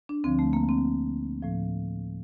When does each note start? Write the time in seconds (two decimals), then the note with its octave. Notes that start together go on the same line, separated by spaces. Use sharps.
0.09 D4
0.24 D2 D3 F3 C4
0.39 A3
0.53 A#3
0.69 C4
1.43 A2 F3